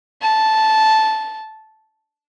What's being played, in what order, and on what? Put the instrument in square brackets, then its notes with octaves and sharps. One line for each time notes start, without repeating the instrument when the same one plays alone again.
[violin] A5